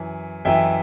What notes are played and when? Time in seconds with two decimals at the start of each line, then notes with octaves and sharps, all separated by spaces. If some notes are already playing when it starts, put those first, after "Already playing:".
Already playing: F#2 E3
0.45 F#2 E3 E5 G5